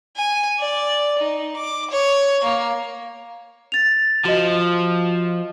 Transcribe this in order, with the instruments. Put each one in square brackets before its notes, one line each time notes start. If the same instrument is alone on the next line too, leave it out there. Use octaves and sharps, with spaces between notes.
[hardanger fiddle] G#5
D5
D#4
D6
C#5
A#3
[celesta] A6 F7
[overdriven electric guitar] F3 [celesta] F#4 D#5